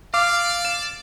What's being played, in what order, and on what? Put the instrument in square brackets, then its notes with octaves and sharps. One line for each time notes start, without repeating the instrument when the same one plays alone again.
[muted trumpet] D5 [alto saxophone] F5 [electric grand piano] D6
[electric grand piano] E7